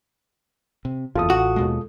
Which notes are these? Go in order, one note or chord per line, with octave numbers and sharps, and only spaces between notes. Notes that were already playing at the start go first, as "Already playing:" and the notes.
C3
F#1 E2 F4 A4 D#6
A1 F#4
D#2 B2 G#3